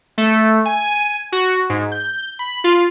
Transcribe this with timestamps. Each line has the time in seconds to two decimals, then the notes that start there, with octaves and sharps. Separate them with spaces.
0.18 A3
0.66 G#5
1.32 F#4
1.70 G#2
1.92 G6
2.39 B5
2.64 F4